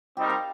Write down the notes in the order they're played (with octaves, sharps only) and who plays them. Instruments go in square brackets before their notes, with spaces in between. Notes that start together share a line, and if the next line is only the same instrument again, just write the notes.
[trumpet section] G3 C4 D#4 A#4 [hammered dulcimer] G4
[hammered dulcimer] F5